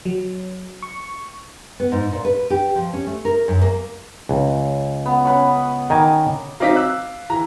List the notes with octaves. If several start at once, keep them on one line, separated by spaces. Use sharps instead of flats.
F#3
C#6
B3
G#2
A#2
B4
G4
F3
C#4
A3
A#4
F#2
A#3
C#2
B3
C#4 B4 C#5
D#3 G#5 A#5 D6
F#3 C4 D#4 F5 D6 B6
E6 F#6
E3 A#5